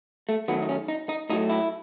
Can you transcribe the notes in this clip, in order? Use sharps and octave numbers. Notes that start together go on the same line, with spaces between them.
A3
D#3 F#3 A3 B3
D#4
C#4
D#4
D#4
A2 F#3 A3 D#4
E4